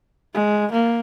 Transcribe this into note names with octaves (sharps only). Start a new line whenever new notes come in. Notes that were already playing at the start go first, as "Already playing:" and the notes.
G#3
A#3